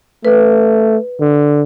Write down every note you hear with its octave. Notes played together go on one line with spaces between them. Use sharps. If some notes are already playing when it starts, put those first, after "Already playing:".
A3 B4
D3